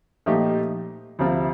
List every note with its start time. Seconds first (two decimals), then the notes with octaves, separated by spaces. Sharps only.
0.26 A#2 F3 A3 D#4 G4
1.19 D2 C3 F3 C4 F4